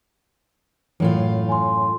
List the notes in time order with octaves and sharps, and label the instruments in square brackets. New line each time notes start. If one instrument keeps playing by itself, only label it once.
[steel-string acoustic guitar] F#2 A2 F4 [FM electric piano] E3
[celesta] G#5 C6